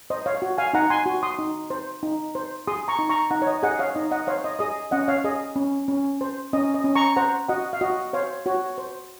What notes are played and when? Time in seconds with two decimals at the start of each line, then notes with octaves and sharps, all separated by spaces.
0.10 C5 D#5
0.26 C#5 F5
0.42 F#4
0.58 F5 G#5
0.73 D#4 F#5 A#5
0.90 G#5 C6
1.06 F#4
1.23 C6 D#6
1.39 D#4
1.70 C5
2.03 D#4
2.35 C5
2.68 G#4 C6 D#6
2.88 A#5 C#6
2.99 D#4
3.10 A#5 C#6
3.31 D#4 F#5 A#5
3.42 C#5
3.47 D#5
3.63 G#4 D#5 F#5
3.79 C#5 F5
3.95 D#4 D#5
4.11 D#5 F#5
4.27 C5 C#5 F5
4.44 D#5
4.59 G#4 D#5
4.91 C#4 D#5 F#5
5.08 C#5 F5
5.24 G#4 D#5
5.56 C#4
5.88 C#4
6.21 C5
6.53 C#4 D#5
6.74 D#5
6.84 C#4
6.95 A#5 C#6
7.16 C5 F#5 A#5
7.49 F#4 D#5 F#5
7.73 F5
7.81 F#4 D#5
8.13 C5 C#5 F5
8.46 F#4 C#5
8.78 C5